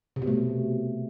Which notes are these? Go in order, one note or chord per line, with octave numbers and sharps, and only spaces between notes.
C3
B2
A3